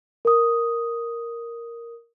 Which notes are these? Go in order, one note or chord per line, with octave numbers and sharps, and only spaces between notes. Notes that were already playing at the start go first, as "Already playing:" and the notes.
A#4 D#6